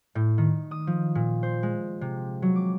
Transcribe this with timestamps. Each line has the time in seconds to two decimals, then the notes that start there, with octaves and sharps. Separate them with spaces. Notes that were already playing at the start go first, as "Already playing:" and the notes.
0.15 A2
0.38 D#3
0.71 D#6
0.87 F3
1.15 A#2
1.43 C5
1.63 G#3
2.01 C3
2.42 F#3
2.56 D6